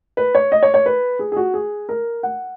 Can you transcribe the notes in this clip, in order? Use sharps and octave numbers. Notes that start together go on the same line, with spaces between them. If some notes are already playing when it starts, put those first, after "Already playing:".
B4
C#5
D#5
C#5
C#5
B4
G#4
G#4
F#4
G#4
A#4
F#5